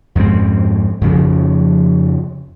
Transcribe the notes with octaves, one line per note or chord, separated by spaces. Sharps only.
F2 G#2 G3 C4
F2 C#3 F3